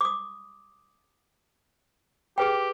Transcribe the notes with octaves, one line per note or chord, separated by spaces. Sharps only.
D6 D#6
G4 G#4 B4 G5